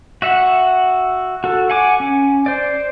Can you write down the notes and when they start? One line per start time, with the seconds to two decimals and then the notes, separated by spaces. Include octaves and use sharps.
0.22 F#4 E5 F#5
1.44 F#4 A4
1.70 F#5 G#5 D6
2.00 C#4
2.46 C5 D5